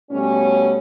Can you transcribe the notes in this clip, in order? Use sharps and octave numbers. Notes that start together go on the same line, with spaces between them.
B2 G3 A3 C#4